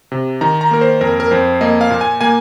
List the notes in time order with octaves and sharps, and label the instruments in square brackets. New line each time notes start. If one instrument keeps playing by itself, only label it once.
[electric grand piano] C3
D#3 A#5
A#5
A#3 A#4
C5
F2 A#4
A#4
F2 C5
A#3 D#5
F5
A#2
G#5
A#3 G#5